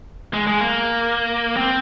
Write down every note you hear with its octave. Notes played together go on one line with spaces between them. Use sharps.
G#3
G#3
A#3
C4